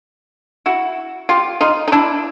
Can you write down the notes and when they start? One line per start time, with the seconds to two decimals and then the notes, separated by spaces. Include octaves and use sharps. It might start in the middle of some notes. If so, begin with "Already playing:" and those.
0.66 E4 F#4
1.29 F4 G4
1.61 D#4 F4
1.88 D#4
1.92 D4 E4